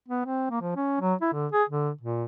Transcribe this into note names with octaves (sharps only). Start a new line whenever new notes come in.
B3
C4
A#3
F3
C#4
F#3
E4
D3
G#4
D3
A#2